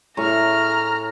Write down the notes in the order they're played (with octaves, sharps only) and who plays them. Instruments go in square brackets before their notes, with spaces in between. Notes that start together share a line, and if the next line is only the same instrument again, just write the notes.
[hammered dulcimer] A2 G#5 C#6 [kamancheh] A#5 F6